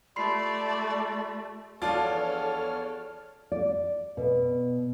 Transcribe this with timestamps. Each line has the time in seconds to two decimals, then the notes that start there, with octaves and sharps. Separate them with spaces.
0.16 A3 F4 G4 D5 B5 C6 C7
1.82 E2 F3 D4 F4 A4 C#5 D5 F6
3.52 D5
4.17 B2